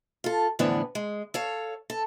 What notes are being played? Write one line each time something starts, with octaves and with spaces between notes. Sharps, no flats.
F4 A4
F2 A2 D3 E3 B3 D4
G#3
A4 C#5 F5
A4